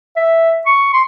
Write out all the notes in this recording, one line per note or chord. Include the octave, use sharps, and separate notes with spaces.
E5
C#6
C6